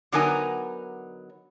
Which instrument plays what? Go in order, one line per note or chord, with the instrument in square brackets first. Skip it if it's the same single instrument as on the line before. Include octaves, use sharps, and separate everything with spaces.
[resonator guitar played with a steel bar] D3 F#3 B3 D#4 A#4 G#5